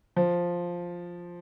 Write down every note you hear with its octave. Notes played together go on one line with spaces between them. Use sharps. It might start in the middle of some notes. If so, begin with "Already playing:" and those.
F3